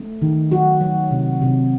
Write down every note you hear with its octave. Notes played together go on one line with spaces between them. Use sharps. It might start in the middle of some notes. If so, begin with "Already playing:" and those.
Already playing: A3
D#3
F#3 F#4
F#3
C3
C3